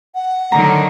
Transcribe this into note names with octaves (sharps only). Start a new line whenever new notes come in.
F#5
D3 D#3 F#3 A#5